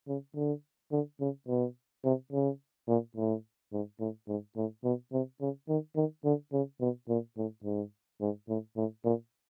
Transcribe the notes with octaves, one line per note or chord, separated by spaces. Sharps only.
C#3
D3
D3
C#3
B2
C3
C#3
A#2
A2
G#2
A2
G#2
A2
B2
C3
C#3
D#3
D#3
D3
C#3
B2
A#2
A2
G#2
G#2
A2
A2
A#2